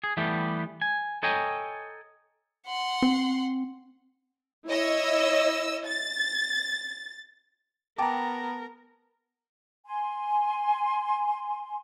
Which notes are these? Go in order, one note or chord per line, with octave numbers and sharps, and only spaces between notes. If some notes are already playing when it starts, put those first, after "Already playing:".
G#4
E3 G3 A3 B3 G4
G#5
A4 C#5 D#5 G5 G#5 A#5
F#5 C6
C4
E4 C#5 D#5 E6
A6
B3 A#4 G5 A5 A#5 D6
G#5 C6